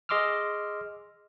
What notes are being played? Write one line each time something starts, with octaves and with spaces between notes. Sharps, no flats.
G#4 D#5 C6 D6 E6 F6